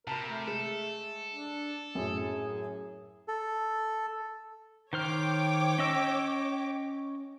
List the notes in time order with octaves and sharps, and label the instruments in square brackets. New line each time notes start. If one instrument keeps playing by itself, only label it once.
[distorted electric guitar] C3 [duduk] A#4 [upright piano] A5 B5
[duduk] A3
[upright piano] G#3 [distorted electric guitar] A4
[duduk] D4
[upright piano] F#2 A2 [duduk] G#4
[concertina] A4
[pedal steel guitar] D#3 C5 F6 [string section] C#5 G5 D6
[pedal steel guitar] C#4 D#5 E6